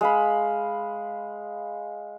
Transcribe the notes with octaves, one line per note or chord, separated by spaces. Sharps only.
G#3 F5 B5